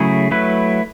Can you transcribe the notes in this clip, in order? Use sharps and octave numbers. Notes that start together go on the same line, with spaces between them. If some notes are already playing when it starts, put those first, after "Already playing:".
Already playing: C#3 F#3 A3 E4 G#4
F#3 A3 E4 B4